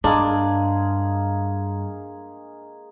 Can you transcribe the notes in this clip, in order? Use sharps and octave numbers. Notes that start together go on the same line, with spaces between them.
G2 G#3 A#3 D4 G#4